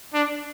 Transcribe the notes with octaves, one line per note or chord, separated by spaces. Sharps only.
D4